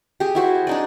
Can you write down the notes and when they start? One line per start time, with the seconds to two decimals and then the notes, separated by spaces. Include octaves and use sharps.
0.20 G4 G#4
0.35 E4 F#4 C5
0.67 D4 D#4 D5